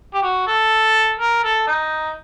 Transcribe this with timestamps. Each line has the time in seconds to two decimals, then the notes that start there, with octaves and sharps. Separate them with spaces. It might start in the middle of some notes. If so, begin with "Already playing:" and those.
0.14 G4
0.23 F#4
0.47 A4
1.19 A#4
1.44 A4
1.68 D#4